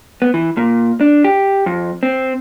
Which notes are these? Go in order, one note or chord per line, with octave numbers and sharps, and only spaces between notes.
B3
E3
A#2
D4
G4
F2
C4